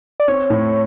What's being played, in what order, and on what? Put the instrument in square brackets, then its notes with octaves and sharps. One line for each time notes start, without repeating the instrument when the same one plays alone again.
[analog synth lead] D5
[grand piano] C4 [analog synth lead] C#5
[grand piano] A2